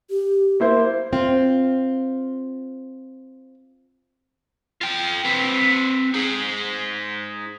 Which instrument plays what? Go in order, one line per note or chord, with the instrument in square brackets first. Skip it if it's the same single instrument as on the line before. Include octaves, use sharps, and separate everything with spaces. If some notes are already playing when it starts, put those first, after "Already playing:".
[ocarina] G4
[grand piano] A#3 E4 C5
[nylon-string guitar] C4 F4
[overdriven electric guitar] F4 G5
C4 B4
D#4 G#4